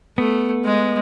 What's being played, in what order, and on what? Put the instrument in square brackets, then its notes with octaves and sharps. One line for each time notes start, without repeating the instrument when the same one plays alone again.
[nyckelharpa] A3 [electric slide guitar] B3
[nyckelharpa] G#3